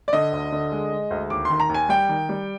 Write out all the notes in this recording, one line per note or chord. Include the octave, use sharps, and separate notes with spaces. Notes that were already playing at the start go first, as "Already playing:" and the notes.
D5
D3 D#5
D2
D3
G#3
G#3
D2
D#2 D6
D#3 C6
A#5
D#2
G#5
G3 G5
D#3
G3